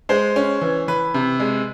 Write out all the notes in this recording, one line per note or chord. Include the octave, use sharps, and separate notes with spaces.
G#3 C5
C#4
E3
E3 B4
C3
G#3